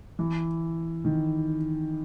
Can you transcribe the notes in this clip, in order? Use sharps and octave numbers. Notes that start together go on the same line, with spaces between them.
E3
D#3